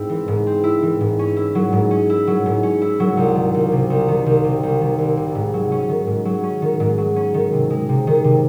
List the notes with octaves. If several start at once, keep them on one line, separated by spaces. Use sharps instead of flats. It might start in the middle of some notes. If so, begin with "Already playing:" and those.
Already playing: G#2 C4 E4
E3
G#2
C4
E4
E3
G#2
C#4
E4
F#3
G#2
C#4
E4
F#3
G#2
C#4
E4
F#3
C2
D#3
C2
C3
C2
D#3
C2
C3
C2
D#3
C2
C3
G#2
F#3
C#4
D#3
G#2
F#3
C#4
D#3
G#2
F#3
C#4
D#3
C3
G#3
C3
D#3
C3